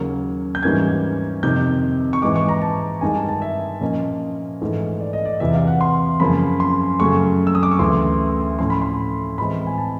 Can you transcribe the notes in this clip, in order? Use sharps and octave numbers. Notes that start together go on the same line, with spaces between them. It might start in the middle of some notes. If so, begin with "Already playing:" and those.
Already playing: D#2 C#3 F#3 A#3
G6
G#2 E3 G3 A#3 C#4 G#6
F2 C3 D#3 G6
C#6
G#2 E3 G#3 D6
C#6
A#5
A5
G2 D#3 G#3 G#5
A5
A5
E5
A#2 F3 A#3 C#4 D#5
G#2 E3 A3
D5
D#5
D5
E2 C3 E3 E5
F5
F#5
C6
F#2 C#3 F3 A#3 B5
C6
F#2 C#3 F#3 A3 C#6
E6
D#6
D6
C#6
D2 C#3 E3 A3 C6
A2 F3 A3 C#4 C6
B5
C6
A2 E3 G#3 C4 B5
G#5
A5